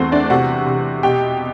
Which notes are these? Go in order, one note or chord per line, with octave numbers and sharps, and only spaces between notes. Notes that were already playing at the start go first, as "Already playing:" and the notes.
Already playing: E2 A3 C4 F#4 C5
D4 D5
C3 F#4 F#5
C3
B2 G4 G5